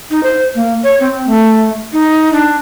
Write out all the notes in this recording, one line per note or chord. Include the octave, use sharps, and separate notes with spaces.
D#4
C5
A#3
C#5
C4
A3
D#4
D4